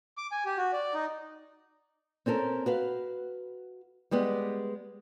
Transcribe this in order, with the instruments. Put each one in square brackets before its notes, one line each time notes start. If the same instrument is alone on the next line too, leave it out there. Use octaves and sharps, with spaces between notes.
[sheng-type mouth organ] D6
G#5
G4
F#4
D5
D#4
[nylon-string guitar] C4 C#4 A4 A#4
F#4 B4 F5
G3 G#3 B3 G4